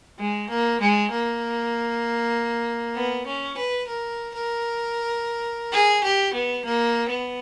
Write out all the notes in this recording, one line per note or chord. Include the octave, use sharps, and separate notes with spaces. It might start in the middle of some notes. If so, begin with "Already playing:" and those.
G#3
A#3
G#3
A#3
B3
C#4
B4
A#4
A#4
G#4
G4
B3
A#3
B3